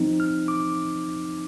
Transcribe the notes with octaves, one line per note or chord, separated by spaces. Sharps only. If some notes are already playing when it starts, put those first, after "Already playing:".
Already playing: F3 C4 D#4
F6
D6